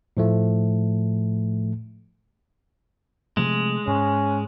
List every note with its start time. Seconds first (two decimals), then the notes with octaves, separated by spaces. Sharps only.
0.17 A2 F3 A3
3.37 C3 F3 G#3 A3
3.87 G#2 C#4